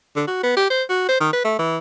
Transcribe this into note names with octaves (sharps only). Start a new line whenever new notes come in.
D3
F#4
B3
G4
C5
F#4
C5
D#3
B4
A3
E3